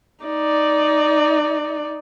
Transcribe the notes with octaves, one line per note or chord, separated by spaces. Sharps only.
D#4 D5